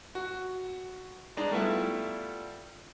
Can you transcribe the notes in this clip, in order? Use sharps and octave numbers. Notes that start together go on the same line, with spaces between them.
F#4
G#3 D4 D#4
G3 A3 B3 D4 E4 F4